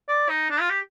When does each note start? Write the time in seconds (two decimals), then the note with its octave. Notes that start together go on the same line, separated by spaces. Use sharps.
0.08 D5
0.29 D#4
0.50 D4
0.60 F4
0.70 G4